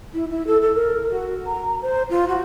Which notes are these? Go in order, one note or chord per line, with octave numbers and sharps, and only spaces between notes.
E4
E4
A4
A4
A#4
F#4
A#5
C5
F4
F#4